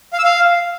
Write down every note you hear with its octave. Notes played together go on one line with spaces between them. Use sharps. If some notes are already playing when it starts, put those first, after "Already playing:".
F5
E6
F5